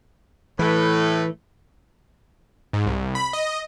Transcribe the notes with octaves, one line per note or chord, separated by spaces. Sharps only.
A2 E3 A3 B4
G#2
C2
B5
D#5